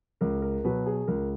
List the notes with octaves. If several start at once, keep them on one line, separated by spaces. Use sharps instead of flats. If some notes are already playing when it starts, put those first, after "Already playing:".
C#2 A#4
A#4
B2 F#3 B4
G#4
C#2 A#4